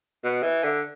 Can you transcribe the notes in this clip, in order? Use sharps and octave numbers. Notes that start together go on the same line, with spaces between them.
B2
E3
D3